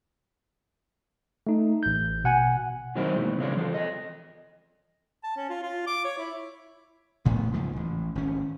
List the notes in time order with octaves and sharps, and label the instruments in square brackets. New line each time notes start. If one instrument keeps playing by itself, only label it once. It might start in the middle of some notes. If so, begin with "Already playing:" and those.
[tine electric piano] A3 D#4
A1 G6
B2 F#5 G#5
[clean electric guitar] D#3 F#3 A#3 C4 D#4 E4
E2 G#2 B2 E3
E2 C#3 F#3 G#3 C#4 D5
E3 F3 F4 A4
A4 D#5
[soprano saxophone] A5
C#4
F4
F4
D6
C#5
E4
[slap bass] A1 A2 B3
C#2 G#2 F3
A1
G#1 C#4